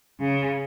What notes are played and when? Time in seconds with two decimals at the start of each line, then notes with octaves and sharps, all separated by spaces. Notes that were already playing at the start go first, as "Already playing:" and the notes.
0.20 C#3